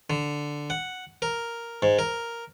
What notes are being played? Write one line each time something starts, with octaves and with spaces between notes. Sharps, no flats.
D3
F#5
A#4
G#2
A#4